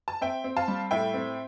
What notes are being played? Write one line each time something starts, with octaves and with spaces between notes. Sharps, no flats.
A5
C4 E5 G5
C4
F5 A5
G3
A2 E5 G5
C4